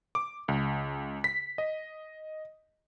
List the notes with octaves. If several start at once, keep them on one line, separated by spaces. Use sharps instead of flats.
D6
C#2
B6
D#5